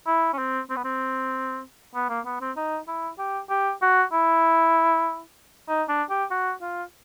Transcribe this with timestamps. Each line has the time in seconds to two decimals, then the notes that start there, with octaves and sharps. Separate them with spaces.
0.07 E4
0.33 C#4
0.38 C4
0.70 C4
0.76 B3
0.85 C4
1.95 B3
2.09 A#3
2.26 B3
2.41 C4
2.57 D#4
2.87 E4
3.18 G4
3.50 G4
3.82 F#4
4.13 E4
5.69 D#4
5.88 D4
6.10 G4
6.31 F#4
6.61 F4